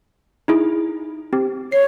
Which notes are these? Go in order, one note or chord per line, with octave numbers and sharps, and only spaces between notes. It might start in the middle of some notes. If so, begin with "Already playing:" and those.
D#4 E4 G#4
C4 G4
C#5 C7